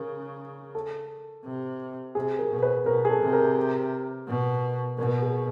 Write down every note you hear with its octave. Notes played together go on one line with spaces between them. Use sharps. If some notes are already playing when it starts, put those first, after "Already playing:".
Already playing: C#3 A#4
A4
C3
C3 G#4
A#4
B2
B4
B2 A#4
G#4
A4
C3
A#4
B2
B2 A#4
G#4